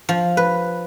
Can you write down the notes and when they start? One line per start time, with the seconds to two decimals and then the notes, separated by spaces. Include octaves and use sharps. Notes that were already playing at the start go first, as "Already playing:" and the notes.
0.09 F3
0.37 B4